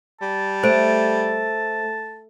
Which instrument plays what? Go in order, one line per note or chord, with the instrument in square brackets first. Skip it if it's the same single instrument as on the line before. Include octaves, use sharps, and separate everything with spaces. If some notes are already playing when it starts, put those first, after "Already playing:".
[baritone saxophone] G3 [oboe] A5
[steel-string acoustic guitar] A3 [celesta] C5 D7